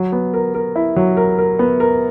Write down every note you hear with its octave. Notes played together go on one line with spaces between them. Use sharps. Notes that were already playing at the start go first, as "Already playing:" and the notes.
Already playing: F#3
B3
A#4
A#4
E4
F#3
A#4
A#4
B3
A#4